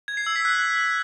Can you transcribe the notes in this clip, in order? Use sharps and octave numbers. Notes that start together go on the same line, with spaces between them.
G#6
C7
E6
B6
F#6